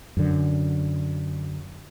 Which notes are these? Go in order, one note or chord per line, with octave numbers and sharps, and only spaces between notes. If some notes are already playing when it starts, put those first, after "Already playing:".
F#2 D3